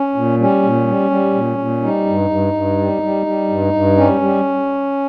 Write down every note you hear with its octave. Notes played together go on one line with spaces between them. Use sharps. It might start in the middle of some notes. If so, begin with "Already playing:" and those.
Already playing: C#4
A#2
G3 C#4
A#2
G3
G3
A#2
A#2
G3 D#4
G2
G2
G2
G3
G3
G3
G2
G2
G3 C#4
G3